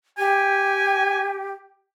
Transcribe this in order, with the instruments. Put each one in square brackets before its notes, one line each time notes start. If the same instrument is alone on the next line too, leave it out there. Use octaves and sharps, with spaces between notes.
[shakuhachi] G4 [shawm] G#5